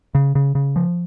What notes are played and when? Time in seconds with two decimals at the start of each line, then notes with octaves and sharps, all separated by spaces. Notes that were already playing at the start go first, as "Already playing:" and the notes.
0.15 C#3
0.35 C#3
0.55 C#3
0.76 F3